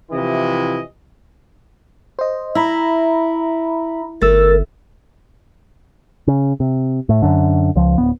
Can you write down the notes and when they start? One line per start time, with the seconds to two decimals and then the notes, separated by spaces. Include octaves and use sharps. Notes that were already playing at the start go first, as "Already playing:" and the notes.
0.11 C3 E3 F3 E4 D#5
2.19 C5 D#5
2.55 E4 E5 A#5 B5
4.22 G1 A3 A#4 E6 A6
6.27 C#3
6.60 C3
7.09 A2
7.22 F#2 D3
7.76 C#2 F3
7.98 D1 B3